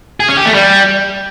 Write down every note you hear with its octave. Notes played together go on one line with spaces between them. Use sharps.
G#4
C#4
G4
A3
G3